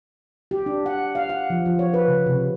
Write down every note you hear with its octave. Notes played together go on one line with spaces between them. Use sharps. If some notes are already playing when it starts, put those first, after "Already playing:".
G4
D4
F#5
F5
F#5
F3
F3
C#5
B4
C#3
C3